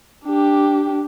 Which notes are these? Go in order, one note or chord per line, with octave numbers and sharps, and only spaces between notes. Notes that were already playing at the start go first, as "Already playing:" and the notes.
D4 G4